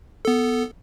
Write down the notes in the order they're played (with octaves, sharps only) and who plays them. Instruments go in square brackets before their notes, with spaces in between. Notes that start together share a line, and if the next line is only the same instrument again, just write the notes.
[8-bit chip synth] B3 A4